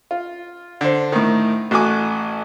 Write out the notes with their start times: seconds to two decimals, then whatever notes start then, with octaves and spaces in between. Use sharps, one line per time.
0.11 F4
0.81 D3 C5
1.12 A2 D#3
1.71 A1 F#4 G#5 D6